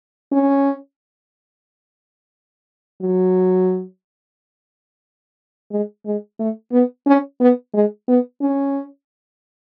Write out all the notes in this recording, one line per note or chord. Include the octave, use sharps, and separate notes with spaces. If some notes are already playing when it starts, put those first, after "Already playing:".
C#4
F#3
G#3
G#3
A3
B3
C#4
B3
G#3
B3
C#4